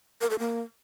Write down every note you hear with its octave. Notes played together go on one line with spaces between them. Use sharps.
A#4
A4
A#3